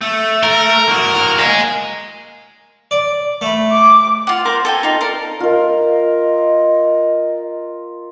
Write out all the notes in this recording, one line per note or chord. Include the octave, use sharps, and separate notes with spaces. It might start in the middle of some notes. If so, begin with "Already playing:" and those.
A3
A#4
A#3 F#4
D#5 G#5
D5
A3 B5
D6
F4 F#5
A#4 C5 D6
A4 G5 G#5
D#4 F4
A4 A#4 D5
F4 A#4 D#5